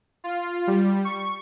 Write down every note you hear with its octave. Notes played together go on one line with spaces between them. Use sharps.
F4
G3
C#6